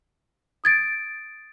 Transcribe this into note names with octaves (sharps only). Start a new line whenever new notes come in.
D#6 G#6 A6 D7